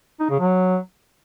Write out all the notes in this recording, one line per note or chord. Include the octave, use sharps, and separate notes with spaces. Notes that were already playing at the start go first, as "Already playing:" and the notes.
D#4
C#3
F#3